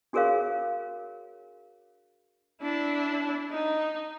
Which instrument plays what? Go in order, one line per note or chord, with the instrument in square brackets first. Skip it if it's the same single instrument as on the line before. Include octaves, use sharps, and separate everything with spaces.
[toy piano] D4 F#4 G#4 A#4 C#5 F5
[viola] D4 E4
D#4